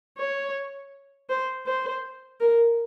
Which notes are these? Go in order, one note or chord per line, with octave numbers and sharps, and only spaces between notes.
C#5
C5
C5
A#4